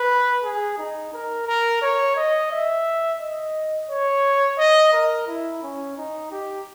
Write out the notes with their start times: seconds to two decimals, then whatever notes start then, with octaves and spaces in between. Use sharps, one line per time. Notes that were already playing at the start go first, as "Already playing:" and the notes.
Already playing: B4
0.44 G#4
0.78 D#4
1.13 A#4
1.47 A#4
1.82 C#5
2.16 D#5
2.51 E5
3.20 D#5
3.89 C#5
4.58 D#5
4.93 A#4
5.27 E4
5.63 C#4
5.97 D#4
6.31 G4